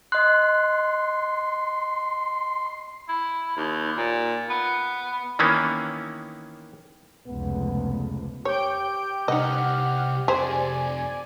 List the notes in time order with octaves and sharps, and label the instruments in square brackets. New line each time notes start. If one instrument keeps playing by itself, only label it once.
[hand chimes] D#5 F#6 [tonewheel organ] C6
[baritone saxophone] E4
D#2
A#2
B3
[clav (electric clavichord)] D#3 E3 A#3 B3 C#4
[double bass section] F1 C#2 [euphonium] B3
[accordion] G4 [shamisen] C#5 [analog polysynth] G5 G6 D7
[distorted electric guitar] C2 [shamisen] D#4 D#5 [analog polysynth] F#5 F6
[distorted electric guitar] F2 C3 [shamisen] G4 G#4 C5 [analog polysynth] D5 G#5